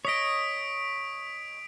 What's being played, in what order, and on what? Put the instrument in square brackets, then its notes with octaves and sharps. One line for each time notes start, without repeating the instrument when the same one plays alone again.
[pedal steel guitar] C#5 D#5 [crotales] D#6 B6 D7